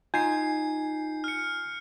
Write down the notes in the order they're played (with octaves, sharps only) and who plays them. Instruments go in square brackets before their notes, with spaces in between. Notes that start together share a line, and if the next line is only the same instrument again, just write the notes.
[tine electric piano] D#4 F4 [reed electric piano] G#5 [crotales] G6 C7
[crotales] F6 C#7